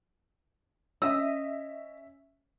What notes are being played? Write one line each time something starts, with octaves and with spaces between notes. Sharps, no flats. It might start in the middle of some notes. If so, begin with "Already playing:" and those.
C#4 D#5 E5 E6